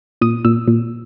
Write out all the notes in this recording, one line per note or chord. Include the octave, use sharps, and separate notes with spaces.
A#2 D#6
A#2 E6
A#2